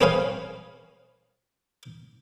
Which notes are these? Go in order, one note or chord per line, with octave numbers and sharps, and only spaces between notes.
C4 G#4 B4 C#5 F5 G#5